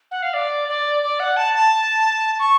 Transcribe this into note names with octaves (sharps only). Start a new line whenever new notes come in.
F#5
F5
D5
D5
D5
F#5
A5
A5
C#6